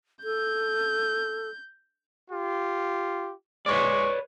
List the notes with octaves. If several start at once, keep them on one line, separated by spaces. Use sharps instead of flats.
A4 G6
F4 G4
G#3 B4 C#5 D5 C#6